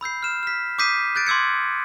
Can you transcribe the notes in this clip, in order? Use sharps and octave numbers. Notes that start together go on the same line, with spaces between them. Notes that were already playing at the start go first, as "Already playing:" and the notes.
B5 E6 G6 C7
F6 E7
F6 B6
D6 D#6 G6 B6 C7 D#7
F#6 G6 A6 D7
C6 D6 E6 G#6 C#7